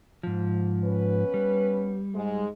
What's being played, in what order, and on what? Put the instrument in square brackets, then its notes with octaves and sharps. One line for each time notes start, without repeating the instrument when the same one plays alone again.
[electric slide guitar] G#2 F3
[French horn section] B3 C#4 B4
[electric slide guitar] G3
[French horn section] G#2 G#3